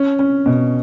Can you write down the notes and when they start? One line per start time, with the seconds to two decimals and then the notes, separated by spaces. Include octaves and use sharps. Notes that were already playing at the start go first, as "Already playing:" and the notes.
Already playing: C#4
0.19 C#4
0.46 B2